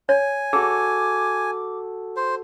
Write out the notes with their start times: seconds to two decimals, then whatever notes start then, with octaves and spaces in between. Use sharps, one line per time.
0.09 C#5 G#5
0.53 F#4 G#4 A4 D6
2.16 C5